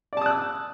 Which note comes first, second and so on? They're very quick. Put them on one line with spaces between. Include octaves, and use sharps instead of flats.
D5 A5 D#6 F#6 E6